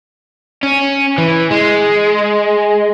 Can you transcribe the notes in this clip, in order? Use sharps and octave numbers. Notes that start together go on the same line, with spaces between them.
C#4
E3
G#3